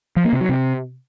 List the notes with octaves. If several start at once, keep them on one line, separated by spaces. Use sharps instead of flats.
F3
A#3
C3
F#3
C3